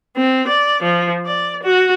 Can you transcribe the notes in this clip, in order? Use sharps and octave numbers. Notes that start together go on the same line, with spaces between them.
C4
D5
F3
D5
F#4